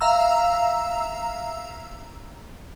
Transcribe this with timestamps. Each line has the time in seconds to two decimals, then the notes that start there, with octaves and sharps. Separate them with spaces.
0.01 E5 F5 A#5 E6